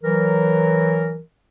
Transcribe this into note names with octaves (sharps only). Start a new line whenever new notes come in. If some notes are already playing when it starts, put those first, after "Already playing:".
E3 F#3 A#4